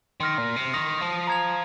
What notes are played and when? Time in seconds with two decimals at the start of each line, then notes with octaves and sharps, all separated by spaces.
0.20 D#3 C6 F6 A#6
0.38 A#2
0.56 C3
0.74 D#3 D#6 A#6 F7
1.01 F3
1.27 A#5 G#6 F7